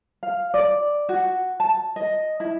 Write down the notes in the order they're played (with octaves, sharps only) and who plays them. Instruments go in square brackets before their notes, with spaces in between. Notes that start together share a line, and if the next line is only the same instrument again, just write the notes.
[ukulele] F5
D5
F#4
A5
D#5
E4